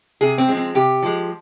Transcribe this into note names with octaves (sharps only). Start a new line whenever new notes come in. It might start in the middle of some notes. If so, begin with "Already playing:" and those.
C3 G#4
C4
F3 G#3
C4
C3 G4
F3 G#3